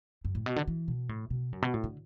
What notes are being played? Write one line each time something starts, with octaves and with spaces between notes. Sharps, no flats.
F#2
A2
B2
D3
E3
B2
A2
B2
F#2
B2
A2
D3